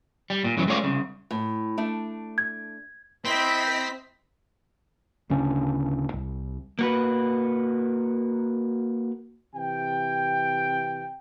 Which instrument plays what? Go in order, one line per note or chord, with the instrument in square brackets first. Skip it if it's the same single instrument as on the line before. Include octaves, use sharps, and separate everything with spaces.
[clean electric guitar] G3
A#2
F#2 C#3 E3 F#3
G#3 A3 C#4 F4 C#5 D5
C2 C#3
[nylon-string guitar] A2
A3 D4
[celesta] G#6
[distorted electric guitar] C4 [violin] E4 D#5 [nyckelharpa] C5 G5 [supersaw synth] B6
[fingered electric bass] D1 C#3 C#4 D4
C2
[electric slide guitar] A#3 F#4 B4
[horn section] C3 E3 G5